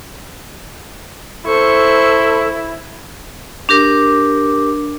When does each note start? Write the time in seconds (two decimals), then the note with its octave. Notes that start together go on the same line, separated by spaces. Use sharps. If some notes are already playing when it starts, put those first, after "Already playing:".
1.46 E4 A4 C5 C#6
3.69 D4 G4 A#4 D6